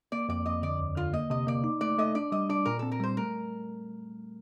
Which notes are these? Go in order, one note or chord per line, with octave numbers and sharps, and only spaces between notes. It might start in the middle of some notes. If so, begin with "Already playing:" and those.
A#3 D5
F2 D5
F2 D#5
D3 D5
D#2
D3 F4
A#3 D#5
C3 D#5
A#3 D5
D#4
A3 D5
A3 D#5
D4 D5
G3 D#5
D4 D5
A#2 A#4
C4 A4
A#4
G3 C5
A3 A#4